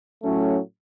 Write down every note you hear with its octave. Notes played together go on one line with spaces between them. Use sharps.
A2 F#3 A3 C#4